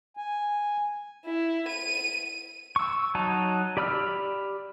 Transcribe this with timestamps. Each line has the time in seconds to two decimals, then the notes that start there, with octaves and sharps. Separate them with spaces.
0.17 G#5
1.25 E4
1.69 D#7
2.76 C#6 E6
3.15 F#3 D#4 A5
3.77 G4 D5 B5 E6 F6